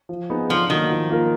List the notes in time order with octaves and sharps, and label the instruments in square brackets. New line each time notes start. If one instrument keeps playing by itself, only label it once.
[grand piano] F3
B3 D#4 G#4
[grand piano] D3 [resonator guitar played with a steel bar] F3
[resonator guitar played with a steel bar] D#3 [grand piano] F#3 A#3
[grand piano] F3
A#3 F4 A#4